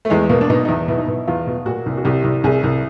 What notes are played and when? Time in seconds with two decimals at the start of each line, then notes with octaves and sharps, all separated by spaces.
0.05 A3
0.10 E2 G#3
0.29 B2 A#3
0.41 D4
0.50 B2 D#4
0.65 D#4
0.68 E2 E4
0.88 B2 E4
0.98 D#4
1.06 B2 E4
1.27 E2 F4
1.47 B2
1.66 A#2 F#4
1.86 C2
1.97 F#4
2.05 C2 G4
2.24 C2
2.44 C2 G#4
2.64 C2